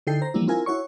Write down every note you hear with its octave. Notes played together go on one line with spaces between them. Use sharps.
D3 D#4 E4 A4 G5 C7
C5 A#5
E3 F3 G3 A#3 D4 E4
C4 E4 F4 A#4 G#5
E4 F#4 C#5 C#6